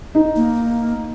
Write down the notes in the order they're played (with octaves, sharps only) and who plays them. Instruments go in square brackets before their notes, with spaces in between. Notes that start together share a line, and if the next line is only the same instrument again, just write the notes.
[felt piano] D#4
[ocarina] A#3